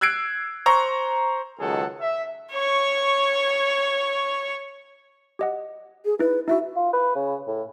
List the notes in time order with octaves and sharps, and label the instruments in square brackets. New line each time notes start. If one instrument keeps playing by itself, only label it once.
[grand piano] E6 F#6 G#6 C7 D7
C5 A#5 C#6
[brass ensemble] C#2 D#3 F#3 G#4 A4 F#5
E5
[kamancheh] C#5 C#6
[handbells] G4 D#5 F#5
[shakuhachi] G#4
[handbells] D#4 E4 [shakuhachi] B4
[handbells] D#4 E4 F#4 [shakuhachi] E5
[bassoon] F4
B4
C#3
A2